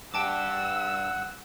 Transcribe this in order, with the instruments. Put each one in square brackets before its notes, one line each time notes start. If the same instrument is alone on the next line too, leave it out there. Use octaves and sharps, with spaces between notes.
[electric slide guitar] G2 G4 [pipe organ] F#5 [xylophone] G5 A5 D6 [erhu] E6